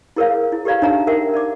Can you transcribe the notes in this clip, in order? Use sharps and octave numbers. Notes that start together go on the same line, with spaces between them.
E4 G#4 A#4 B4 C#5 F5
E4
G4 A4 B4 D5 F5 A#5
D4 D#4 C#5 E5 F5 A#5
A#4 E5 F#5 G5
A#4 D5 D6